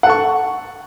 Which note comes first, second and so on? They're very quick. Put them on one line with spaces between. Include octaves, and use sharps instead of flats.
F#5 A4 C#6